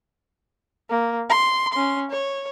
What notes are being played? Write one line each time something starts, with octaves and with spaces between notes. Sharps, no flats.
A#3
C6
C#4 C6
C#5